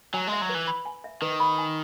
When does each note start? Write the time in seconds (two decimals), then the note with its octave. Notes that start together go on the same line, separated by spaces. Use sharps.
0.14 F#3 G#5
0.27 G#3
0.32 E5
0.41 F#3
0.49 B4
0.55 E3
0.67 B5
0.85 G#5
1.04 E5
1.22 D#3 B4
1.40 B5
1.58 G#5